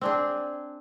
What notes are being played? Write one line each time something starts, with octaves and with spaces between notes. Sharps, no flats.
C4 D4 G#4